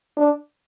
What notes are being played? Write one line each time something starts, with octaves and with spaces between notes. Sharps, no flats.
D4